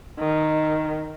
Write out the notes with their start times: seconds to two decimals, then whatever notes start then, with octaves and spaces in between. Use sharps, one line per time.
0.19 D#3